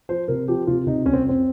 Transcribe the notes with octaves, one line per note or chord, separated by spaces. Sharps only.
F3 C5
C3 A#4
F3 G4
C3 F4
C3 D#4
C2 C#4
C4
F2 C4